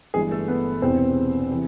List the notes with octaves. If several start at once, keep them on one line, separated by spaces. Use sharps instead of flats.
G1 G2 E3 G#3 G#4
A3 A4
B3 B4
E1 E2 C3 E3 C4 C5
C3 E3